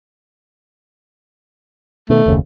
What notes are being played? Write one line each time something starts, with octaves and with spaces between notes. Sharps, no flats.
B2 D#3 A3
F#1 D#2 C#3